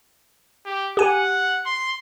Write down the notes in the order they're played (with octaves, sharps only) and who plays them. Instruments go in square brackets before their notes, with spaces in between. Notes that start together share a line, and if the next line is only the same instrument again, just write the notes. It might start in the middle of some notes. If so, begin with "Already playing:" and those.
[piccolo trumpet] G4
[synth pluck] G4 G#5 [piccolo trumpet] F#5
[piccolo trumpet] C6